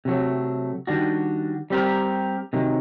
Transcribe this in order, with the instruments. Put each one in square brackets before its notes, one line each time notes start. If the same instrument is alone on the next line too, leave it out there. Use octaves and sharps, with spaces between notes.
[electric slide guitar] C3 F#3 A3
D#3 G3 D4 F#4
G3 C4 G4 A#4
C3 D#3 F#3